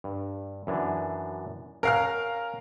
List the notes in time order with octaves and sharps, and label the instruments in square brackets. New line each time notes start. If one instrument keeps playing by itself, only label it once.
[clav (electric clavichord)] G2
F#2 E3 D4
[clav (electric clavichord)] C#4 F#5 [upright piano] A#4 F5 F6